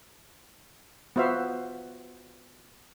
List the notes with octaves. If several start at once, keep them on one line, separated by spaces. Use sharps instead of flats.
B3 F4 F#4 C5 E5 F5